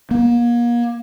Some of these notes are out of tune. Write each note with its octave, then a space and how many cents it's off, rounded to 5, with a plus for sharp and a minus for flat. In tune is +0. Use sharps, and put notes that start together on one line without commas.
A#3 +35